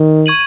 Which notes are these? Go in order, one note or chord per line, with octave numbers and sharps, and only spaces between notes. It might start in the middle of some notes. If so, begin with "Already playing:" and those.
Already playing: D#3
C#6 G#6 D#7 F#7